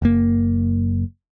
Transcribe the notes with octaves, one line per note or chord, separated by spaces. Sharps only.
F#1 F#2 A#3